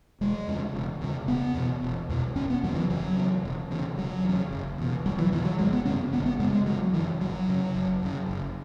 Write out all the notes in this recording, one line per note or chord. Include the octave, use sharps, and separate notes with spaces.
E1 G#3
E2 C#3
E1
E2 C#3
E1 B3
E2 B2
E1
E2 B2
F#1 C#4
B3
E2 C#3 F#3
E3
F#1 F#3
E2 C#3
E1
E2 C#3
E1 F#3
E2
C#3
F#1
E2 B2
F#1 F#3
E3
E2 B2 E3
F#3
G#1 G#3
B3
F#2 C#3 C#4
G#1 B3
B3
F#2 C#3 G#3
G#3
G#1 F#3
C#3 E3
F#2
G#1 F#3
F#2 C#3
F#1
F#2 C#3
F#1